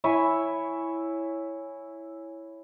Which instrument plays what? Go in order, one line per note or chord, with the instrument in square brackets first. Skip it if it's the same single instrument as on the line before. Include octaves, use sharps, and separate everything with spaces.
[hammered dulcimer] E4 C#5 E5 G#5